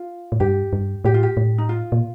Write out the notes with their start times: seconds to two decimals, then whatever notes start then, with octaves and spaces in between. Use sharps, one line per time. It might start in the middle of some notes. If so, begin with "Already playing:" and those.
Already playing: F4
0.32 A2
0.40 G2 G4
0.73 G2
1.05 A2 G4
1.14 F4
1.23 G4
1.37 A2
1.58 D#4
1.69 F4
1.92 A#2